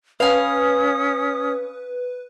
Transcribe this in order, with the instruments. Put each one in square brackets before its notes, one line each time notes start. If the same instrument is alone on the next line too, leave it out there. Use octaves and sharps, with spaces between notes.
[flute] C#4 [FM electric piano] B4 [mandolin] F5 G#5 [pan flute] D#6